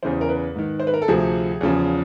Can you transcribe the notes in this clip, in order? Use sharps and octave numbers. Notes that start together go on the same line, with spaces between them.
E2 C#3 E3 C5
A#4
B4
G#2 D#3
C5
B4
A#4
A4
D2 C3 F3 G#4
E2 C#3 F3